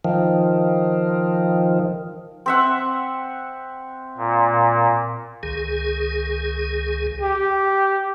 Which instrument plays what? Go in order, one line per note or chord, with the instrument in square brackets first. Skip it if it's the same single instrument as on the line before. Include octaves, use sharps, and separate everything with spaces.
[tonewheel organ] D#3 F3
[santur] C4 E5 F#5
[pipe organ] A#2
[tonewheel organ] C#2 D#3 G#4
[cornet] G4